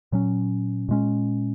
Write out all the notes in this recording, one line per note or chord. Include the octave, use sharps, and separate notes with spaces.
A#2 F#3 C#4
A#2 G#3 C#4